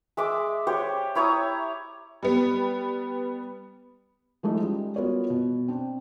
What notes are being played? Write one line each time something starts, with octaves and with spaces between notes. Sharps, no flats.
G#3 E5 D6
G4 C5 C#5
E4 C#5 A#5 D#6
G3 B3
F3 G#3 A3 D#4 E4
G3 G#3 C#4
B3 F4 F#4 A#4 C#5
B2
C4 D4